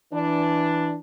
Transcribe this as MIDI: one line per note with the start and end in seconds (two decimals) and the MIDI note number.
0.14 0.96 52
0.14 0.96 62